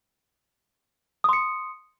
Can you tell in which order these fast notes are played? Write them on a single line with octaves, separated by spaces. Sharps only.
D#6 C6 C#7